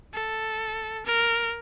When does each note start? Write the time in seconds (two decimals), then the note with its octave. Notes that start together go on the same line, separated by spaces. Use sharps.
0.14 A4
1.06 A#4